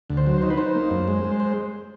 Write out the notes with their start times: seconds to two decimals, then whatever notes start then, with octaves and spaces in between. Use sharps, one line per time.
0.10 D2
0.17 C5
0.26 F#3
0.42 D#4 C5
0.50 B4
0.58 D#4 C5
0.75 A#3
0.91 F#2
1.08 G#3
1.25 G#3
1.40 C5